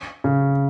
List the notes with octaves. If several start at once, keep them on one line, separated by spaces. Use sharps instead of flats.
C#3